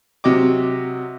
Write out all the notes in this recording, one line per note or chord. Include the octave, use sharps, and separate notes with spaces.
C3 F#3 D#5 D6